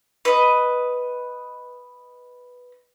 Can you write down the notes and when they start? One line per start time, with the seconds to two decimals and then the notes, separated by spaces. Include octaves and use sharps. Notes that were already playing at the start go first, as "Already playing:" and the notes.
0.25 B4 D#5